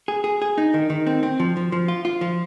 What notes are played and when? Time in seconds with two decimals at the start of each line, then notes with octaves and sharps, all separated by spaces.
0.08 G#4
0.24 G#4
0.42 G#4
0.58 D#4
0.74 D#3
0.90 D#3
1.07 C4
1.23 C4
1.40 F3
1.57 F3
1.72 F3
1.88 F4
2.05 F4
2.21 F3